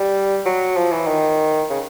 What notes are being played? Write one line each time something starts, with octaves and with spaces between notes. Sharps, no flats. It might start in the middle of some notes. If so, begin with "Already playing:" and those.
Already playing: G3
F#3
F3
E3
D#3
C#3